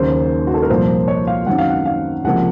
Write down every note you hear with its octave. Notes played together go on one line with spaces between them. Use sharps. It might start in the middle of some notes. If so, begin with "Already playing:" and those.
Already playing: D#2 C#3 F#3 A#3 C5
F#4
A4
A#4
C2 A#2 F3 A#3 C5
C#5
F5
F#2 D#3 F#3 C4 F#5
F5
F#5
F5
C#2 C3 F3 A#3 F#5